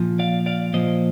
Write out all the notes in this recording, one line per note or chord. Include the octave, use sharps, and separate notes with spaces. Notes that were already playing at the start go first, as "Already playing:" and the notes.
Already playing: A#2 F3
D5 F5
D5 F5
A#2 F3 C5 D#5